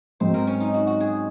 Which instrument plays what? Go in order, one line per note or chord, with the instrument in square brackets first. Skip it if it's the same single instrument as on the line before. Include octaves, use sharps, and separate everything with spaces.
[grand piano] G#2 F#3 C4 [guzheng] C5
[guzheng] A#4
C#4
D#4
F#4
F#4
G#4